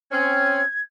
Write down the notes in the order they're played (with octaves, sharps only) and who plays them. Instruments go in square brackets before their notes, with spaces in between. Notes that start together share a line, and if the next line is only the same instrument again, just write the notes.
[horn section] C4 C#4 [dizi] G#6